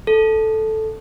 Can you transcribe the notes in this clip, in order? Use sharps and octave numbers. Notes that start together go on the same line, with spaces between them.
A4